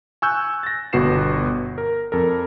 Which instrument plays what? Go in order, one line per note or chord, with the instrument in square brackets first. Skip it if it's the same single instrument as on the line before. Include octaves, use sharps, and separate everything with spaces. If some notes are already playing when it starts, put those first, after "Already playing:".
[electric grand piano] G#5 C#6 E6 F#6 G6
A6 A#6
G1 B2 F#4 B4 C7 E7
A#4
F2 A4 A#4